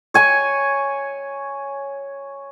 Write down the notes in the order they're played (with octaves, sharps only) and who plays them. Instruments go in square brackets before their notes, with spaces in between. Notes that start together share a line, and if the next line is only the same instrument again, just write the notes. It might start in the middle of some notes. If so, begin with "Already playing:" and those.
[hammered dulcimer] C#5 G#5 C#6